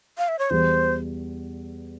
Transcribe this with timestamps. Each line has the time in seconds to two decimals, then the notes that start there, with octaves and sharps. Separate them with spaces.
0.18 F5
0.28 E5
0.39 C#5
0.50 E2 E3 G3 C5